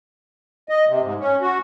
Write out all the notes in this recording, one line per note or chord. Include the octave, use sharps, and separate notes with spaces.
D#5
C3
G#2
C#4
F#4